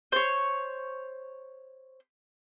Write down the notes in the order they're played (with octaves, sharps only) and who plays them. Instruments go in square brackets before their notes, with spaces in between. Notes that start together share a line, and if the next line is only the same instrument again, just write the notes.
[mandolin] C5 C#5